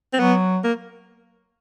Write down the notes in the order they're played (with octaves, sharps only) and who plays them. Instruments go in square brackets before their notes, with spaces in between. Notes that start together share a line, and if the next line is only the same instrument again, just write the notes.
[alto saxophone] C4
[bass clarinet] F#3 [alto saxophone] B3
[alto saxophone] A#3